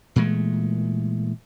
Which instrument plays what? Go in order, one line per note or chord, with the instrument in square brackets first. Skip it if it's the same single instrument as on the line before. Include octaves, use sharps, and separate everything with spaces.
[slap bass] A#2 E3 G#3 A3